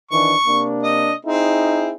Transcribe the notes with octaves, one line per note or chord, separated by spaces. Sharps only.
D#3 E3 D4 C#6
C3 A#3 D4
D#5
C4 D#4 E4 G#4